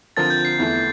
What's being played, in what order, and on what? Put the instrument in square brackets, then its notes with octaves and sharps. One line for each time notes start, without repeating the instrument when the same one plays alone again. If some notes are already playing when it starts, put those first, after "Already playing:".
[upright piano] D3 F3 C4 F4 A#4 [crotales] A6
[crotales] G6
C7
[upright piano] E2 E3 A3